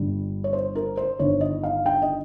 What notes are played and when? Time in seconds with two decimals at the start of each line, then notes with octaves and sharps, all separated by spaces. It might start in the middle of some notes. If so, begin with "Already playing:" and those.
Already playing: G1 G2 G3
0.44 C#5
0.53 C5
0.75 A#4
0.97 C5
1.19 G1 G2 D#3 C#5
1.41 D#5
1.63 F5
1.86 G5
2.02 D#5